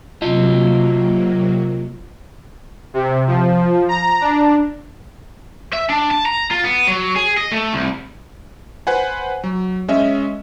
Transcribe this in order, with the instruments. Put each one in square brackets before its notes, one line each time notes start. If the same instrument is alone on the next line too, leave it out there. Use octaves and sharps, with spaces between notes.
[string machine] C3 F#3 A#3 [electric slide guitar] F4 D#5
[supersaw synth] C3
F3
A#5
D4
[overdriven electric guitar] E5
D4
A5
A#5
F4
B3
F#3
G#4
D#5
A3
C2
[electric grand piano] B4 C5 F#5 G#5
F#3
G#3 C#4 D#5 E5